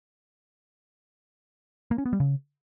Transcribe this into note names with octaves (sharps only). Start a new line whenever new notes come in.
A#3
C#4
B3
G3
C#3